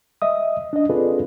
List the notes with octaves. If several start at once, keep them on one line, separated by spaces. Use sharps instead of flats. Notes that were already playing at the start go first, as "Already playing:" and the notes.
D#5 E5 D#6
D4 D#5
C4 F4 G#4 A4 B4 D5